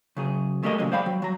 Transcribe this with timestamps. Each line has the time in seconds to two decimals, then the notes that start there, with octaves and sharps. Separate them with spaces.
0.17 C#3 F#3 G#4
0.63 G#3 A3 G4 A#4 C5 D#5
0.78 A#2 C#3 F#3 G#3
0.92 C5 D5 F5 G5 B5
1.06 F#3
1.22 F#3 A#5